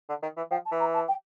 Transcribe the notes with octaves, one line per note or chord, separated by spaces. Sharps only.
D3
D#3
E3
F3 G5
A5
E3
A#5
A5
G5